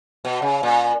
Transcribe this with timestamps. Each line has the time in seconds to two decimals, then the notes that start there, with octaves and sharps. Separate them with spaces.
0.25 B2
0.42 C#3
0.63 A#2